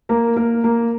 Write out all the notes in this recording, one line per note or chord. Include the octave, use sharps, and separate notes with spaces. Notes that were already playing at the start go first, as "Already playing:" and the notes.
A#3 A#4
A#3 A#4
A#3